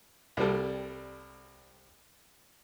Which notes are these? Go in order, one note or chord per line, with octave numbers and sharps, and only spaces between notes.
C2 C3 G3 A4